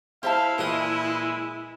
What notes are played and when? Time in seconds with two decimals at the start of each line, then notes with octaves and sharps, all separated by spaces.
0.23 E4 G4 C5 E5 F5 A5
0.58 A#2 E3 G#3 B4 D#5